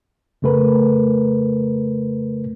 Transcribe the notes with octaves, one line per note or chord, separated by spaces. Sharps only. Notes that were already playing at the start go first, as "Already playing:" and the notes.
F2 C#3 A3 A#4 B4